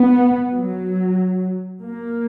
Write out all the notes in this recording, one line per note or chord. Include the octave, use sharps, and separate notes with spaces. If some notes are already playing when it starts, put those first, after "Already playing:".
Already playing: B3
F#3
A#3